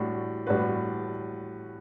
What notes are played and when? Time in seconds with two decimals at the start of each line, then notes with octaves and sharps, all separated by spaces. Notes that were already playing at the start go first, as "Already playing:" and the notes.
Already playing: A2 G3 D4 F#4
0.47 A2 G3 D4 F#4 B4